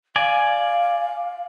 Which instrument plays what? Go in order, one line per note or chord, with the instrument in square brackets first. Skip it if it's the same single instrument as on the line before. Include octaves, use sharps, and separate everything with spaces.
[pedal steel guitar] D5 G#5 [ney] F5